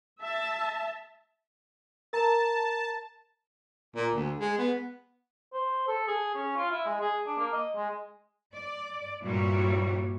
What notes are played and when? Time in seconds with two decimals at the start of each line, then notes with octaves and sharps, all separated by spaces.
0.23 E5 A5
2.13 A#4 A5 A#5
3.96 A#2
4.14 D2
4.40 G#3
4.58 B3
5.53 C5
5.88 A4
6.07 G#4
6.35 C#4
6.56 F4
6.71 E4
6.86 G#3
7.00 G#4
7.27 D4
7.38 A#3
7.53 D#5
7.75 G#3
8.54 D5
9.24 G2 A#2 G3 E4 F#4 C#5